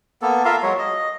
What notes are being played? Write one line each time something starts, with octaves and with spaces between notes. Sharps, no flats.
A#3 B3 A4
F4 A#4 E5 F5
F#3 G#3 C#5
D#5